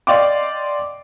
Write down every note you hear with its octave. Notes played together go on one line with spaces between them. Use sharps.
D5 D#5 F5 G5 C6 D6